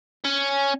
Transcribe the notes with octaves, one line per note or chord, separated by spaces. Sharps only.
C#4